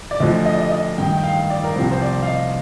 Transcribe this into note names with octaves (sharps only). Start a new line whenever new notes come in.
D5
D2 D3 F3 D#5
D#5
D5
D#5
D#5
G2 D#3 G5
G5
F5
D5
A#4
C2 C3 F3 C5
C5
D5
F5
D#5